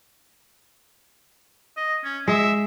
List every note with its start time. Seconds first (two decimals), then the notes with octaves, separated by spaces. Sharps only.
1.77 D#5
2.04 C#4
2.28 G#3 E5